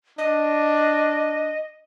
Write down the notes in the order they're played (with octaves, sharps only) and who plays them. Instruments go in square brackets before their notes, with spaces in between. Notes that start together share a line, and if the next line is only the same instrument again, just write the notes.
[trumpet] D4 [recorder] D#5